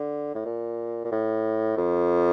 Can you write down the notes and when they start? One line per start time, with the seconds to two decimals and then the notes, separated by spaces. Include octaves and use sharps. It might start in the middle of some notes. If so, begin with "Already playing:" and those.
Already playing: D3
0.35 A2
0.46 A#2
1.05 A#2
1.12 A2
1.77 F2